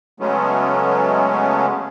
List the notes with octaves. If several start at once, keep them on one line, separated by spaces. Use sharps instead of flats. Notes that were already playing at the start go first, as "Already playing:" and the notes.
C#3 F#3 G#3 A3 B3 C#4